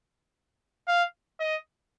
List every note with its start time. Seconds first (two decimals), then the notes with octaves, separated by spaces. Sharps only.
0.88 F5
1.40 D#5